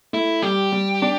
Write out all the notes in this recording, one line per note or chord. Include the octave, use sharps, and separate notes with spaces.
A3 E4
G3 G4
G3
D4